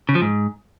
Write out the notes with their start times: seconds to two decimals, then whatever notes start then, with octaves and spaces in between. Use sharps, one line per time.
0.09 C#3
0.15 F3
0.22 G#2